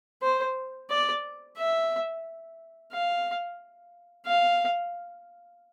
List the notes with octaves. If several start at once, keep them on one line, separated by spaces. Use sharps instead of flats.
C5
D5
E5
F5
F5